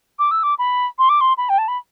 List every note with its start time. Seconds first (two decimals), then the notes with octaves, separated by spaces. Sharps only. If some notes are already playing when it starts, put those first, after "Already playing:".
0.19 D6
0.31 E6
0.43 D6
0.59 B5
0.99 C6
1.09 D6
1.21 C6
1.38 B5
1.49 G5
1.58 A5
1.68 B5